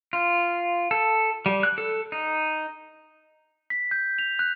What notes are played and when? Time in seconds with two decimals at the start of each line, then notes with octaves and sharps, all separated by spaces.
0.13 F4
0.91 A4
1.46 G3
1.63 F#6
1.78 A4
2.12 D#4
3.70 B6
3.91 G6
4.19 F7
4.39 F#6